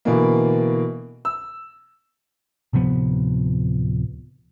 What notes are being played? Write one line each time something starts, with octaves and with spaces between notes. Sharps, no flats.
B2 D3 E3 A#3
E6
D1 C3 F3 B3